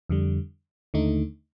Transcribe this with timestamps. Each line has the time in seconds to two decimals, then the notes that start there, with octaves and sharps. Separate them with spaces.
0.09 F2 D3 G3
0.94 D#2 D3 A3 D#4